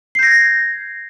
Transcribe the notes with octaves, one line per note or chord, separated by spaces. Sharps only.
G6 G#6 A#6 C7